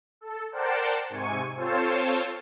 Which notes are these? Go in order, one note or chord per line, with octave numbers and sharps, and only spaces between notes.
A4
A#4 C5 D5 F#5 G5 A5
G#2 C3 G#5 C#6
C4 F4 A4 C5 C#5 A5